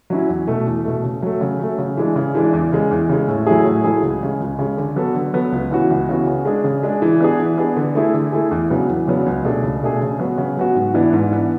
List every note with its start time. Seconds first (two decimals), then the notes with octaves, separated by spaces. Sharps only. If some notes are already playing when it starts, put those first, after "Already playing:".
0.10 F#3 C#4 E4
0.29 E2
0.48 B2 A3
0.67 E2
0.85 B2 A3
1.03 C#3
1.22 F#3 A3
1.41 C#3
1.60 F#3 A3
1.79 C#3
1.97 E3 G#3 D4
2.16 C#3
2.35 E3 G#3 D4
2.53 E2
2.72 C#3 G#3
2.91 E2
3.09 C#3 G#3
3.28 A2
3.47 F#3 A3 E4 G#4
3.65 A2
3.84 F#3 A3 E4 G#4
4.03 C#2
4.22 C#3 G#3
4.40 C#2
4.59 C#3 G#3
4.77 D3
4.96 F#3 B3 F#4 A4
5.15 D3
5.33 F#3 B3 F#4 A4
5.52 C#2
5.71 C#3 E3 B3 F#4
5.90 C#2
6.09 C#3 E3 B3 F#4
6.27 C#3
6.45 G#3 D4 G#4
6.64 C#3
6.83 G#3 D4 G#4
7.02 E3
7.21 B3 D4 G#4
7.39 E3
7.58 B3 D4 G#4
7.77 D3
7.95 A3 E4 G#4
8.14 D3
8.32 A3 E4 G#4
8.51 E2
8.70 C#3 F#3 B3 D4
8.89 E2
9.07 C#3 F#3 B3 D4
9.26 C#2
9.44 B2 A3 D4 G#4
9.63 C#2
9.82 B2 A3 D4 G#4
10.01 C#3
10.19 F#3 B3 F#4
10.38 C#3
10.57 F#3 B3 F#4
10.75 G#2
10.94 E3 B3 D4
11.13 G#2
11.31 E3 B3 D4